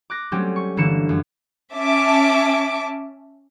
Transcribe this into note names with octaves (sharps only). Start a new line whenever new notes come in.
D6 F#6 A#6
F#3 G3 A3 C4 C#4 G4
C#6
G1 D3 E3 A#3 C#7 E7
F#2
C#4 E5 A5 D6